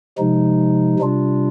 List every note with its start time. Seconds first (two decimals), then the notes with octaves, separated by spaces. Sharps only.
0.18 C3 F3 G#3 D#4
0.99 C3 G3 D4 F4